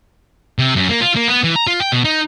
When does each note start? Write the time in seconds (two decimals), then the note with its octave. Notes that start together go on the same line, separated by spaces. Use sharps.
0.59 C3
0.75 F#2
0.89 A#3
1.01 F4
1.16 A#3
1.28 B3
1.44 E3
1.56 A#5
1.67 F4
1.80 G5
1.92 B2
2.05 D#4